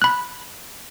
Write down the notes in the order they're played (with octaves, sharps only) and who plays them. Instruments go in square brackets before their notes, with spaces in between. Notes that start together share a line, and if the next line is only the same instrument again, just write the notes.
[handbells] B5 F#6